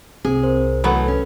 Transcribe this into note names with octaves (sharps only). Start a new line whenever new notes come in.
C2 C4 G#4
A#4 C5
E3 F#3 A3 B3 A4 B5
C#4